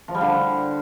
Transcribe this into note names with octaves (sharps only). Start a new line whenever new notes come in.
F3
G3
D3